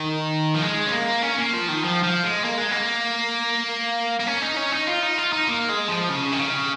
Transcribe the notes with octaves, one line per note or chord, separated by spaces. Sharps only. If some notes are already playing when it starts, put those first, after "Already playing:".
Already playing: D#3
F3
G#3
C#4
A#3
C#4
A#3
F3
D#3
F3
F3
G#3
A#3
G#3
A#3
A#3
C#4
D#4
C#4
D#4
F4
D#4
F4
D#4
A#3
G#3
F3
C#3
D#3
C#3